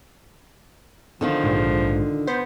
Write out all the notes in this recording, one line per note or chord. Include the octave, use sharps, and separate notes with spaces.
D3 D#3 F3 F4
A#1 G#2
B3 C5